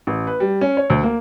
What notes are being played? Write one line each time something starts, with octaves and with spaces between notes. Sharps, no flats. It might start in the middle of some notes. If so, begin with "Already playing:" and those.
A1
B4
G3
C#4
C#5
D2
A#3